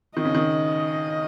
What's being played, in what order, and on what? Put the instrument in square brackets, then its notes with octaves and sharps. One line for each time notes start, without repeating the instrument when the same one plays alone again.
[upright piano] D#3 [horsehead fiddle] D#5
[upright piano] C#3
D#3